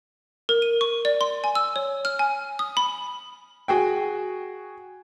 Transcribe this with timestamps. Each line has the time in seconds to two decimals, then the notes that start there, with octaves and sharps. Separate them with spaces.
0.49 A#4
0.62 D#7
0.81 C#6
1.05 D5
1.21 C6
1.44 G#5
1.55 E6
1.76 C#5
2.05 F6
2.19 G#5
2.59 D#6
2.77 B5
3.68 F#4 G#4 G5